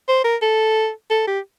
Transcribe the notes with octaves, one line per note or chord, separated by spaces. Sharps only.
C5
A#4
A4
A4
G4